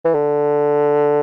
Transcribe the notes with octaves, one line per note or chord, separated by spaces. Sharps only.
E3
D3